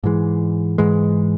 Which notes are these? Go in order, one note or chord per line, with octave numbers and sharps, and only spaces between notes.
G#2 E3 G#3
G#2 E3 G#3